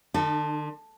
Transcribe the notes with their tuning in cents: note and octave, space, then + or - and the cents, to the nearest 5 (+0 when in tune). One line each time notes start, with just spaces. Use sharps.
D3 +40 D#4 -30 A4 +0